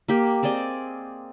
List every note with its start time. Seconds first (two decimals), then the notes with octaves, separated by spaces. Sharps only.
0.08 A#3 G4
0.43 C4 G#4 D5 D#5